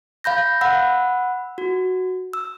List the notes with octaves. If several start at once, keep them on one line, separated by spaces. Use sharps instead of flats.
F5 B5 G6 A#6
F#5 B5 E6
F#4
E6